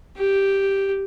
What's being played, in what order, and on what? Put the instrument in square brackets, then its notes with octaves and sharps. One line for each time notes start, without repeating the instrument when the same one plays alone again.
[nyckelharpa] G4